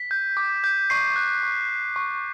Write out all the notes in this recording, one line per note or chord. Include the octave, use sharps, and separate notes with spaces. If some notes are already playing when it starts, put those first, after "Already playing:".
Already playing: B6
G6
D6
G6
C#6 C7
F#6
C#6
F#6
C#6